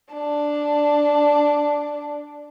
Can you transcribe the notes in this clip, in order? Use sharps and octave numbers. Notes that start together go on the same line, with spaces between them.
D4